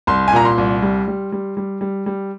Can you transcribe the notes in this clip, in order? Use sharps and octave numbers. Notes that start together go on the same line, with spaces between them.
C2 C6
G#5
A#2 A#5
C6
C2
G3
G3
G3
G3
G3
G3